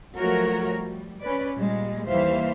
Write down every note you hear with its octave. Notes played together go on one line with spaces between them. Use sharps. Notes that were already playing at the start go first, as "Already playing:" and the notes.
F3 F#3 A3 F#4 A#4 C#5
G3
C#4 B4 D5
A#2 G3 G#3
D#2 E3 G3 C5 E5 F5